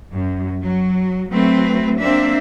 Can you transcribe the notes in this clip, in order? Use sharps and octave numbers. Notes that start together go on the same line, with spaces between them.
F#2
F#3
F#3 A3 C4 B4
A#3 C4 D4 E5